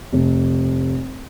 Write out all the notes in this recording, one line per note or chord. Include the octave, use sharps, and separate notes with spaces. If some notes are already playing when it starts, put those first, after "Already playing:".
F1